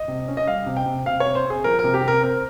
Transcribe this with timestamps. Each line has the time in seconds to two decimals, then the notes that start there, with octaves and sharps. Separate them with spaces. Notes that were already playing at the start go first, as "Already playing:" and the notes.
Already playing: D#5
0.08 C3
0.28 C#4
0.37 D#5
0.47 G3 F5
0.66 C3
0.77 G5
0.86 C3
1.06 C3 F5
1.20 C#5
1.26 C3
1.35 C5
1.45 C4
1.50 G#4
1.64 F3 A#4
1.79 A#4
1.84 C3
1.94 G4
2.03 C3 A#4
2.23 C4 A#4